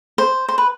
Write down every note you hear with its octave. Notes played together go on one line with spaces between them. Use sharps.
C5
C5
B4